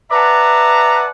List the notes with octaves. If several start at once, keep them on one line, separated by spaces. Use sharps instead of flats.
B4 D5 E5 F#5 A5 A#5